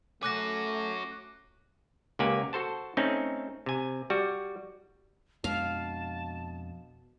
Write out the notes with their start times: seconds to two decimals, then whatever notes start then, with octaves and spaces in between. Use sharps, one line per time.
0.23 A3 C#4 F#4 D6 F#6 A#6
2.19 C#2 A#3 G4 F#5 G#5
2.53 F#4 A4 C5 A5
2.97 A3 C4 C#4 D#4
3.66 C3 G#5
4.10 G3 F#4
5.44 F2 B2 G#3 D4 F5 A5